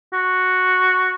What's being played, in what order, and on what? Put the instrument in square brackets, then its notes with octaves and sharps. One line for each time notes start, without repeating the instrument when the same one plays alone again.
[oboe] F#4